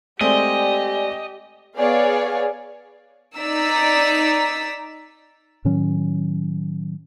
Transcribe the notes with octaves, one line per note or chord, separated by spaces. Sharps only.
G#3 A3 C4 G4 D5 D#5 G#5
B3 G#4 C#5 D5 F5 G#5
D#4 D5 A#5 E6 B6
A2 D#3 F#3 C#4